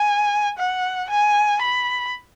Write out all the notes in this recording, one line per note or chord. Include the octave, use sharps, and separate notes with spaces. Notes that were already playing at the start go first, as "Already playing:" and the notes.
Already playing: G#5
F#5
G#5
B5